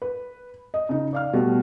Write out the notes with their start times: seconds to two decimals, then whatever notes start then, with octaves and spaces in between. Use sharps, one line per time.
0.02 B4
0.74 D#5
0.89 C#3 D#4
1.13 D5 F5 F6
1.33 B2 G3 A3